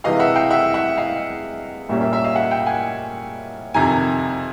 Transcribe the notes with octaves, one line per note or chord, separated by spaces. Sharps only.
C3 E3 G#3 D#5 F5
E5 F#5
F5 G5
E5 F#5
E5 F#5
D#5 F5
A#2 G3 A#3 C#4 E5
E5
E5
D#5 F5
E5 F#5
F5 G5
F#5 G#5
F2 C3 D#3 G#5 A#5